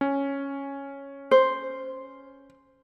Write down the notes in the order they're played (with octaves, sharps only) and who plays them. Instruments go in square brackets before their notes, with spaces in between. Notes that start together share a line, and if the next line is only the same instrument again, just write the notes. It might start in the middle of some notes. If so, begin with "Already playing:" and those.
[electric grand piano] C#4
[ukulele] C5